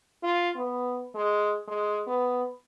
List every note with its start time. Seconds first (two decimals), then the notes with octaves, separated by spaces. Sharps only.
0.23 F4
0.56 B3
1.15 G#3
1.68 G#3
2.07 B3